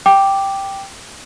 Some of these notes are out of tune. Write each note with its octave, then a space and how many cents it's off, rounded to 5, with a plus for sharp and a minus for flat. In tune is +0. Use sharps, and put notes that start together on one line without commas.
G5 +0 D6 +0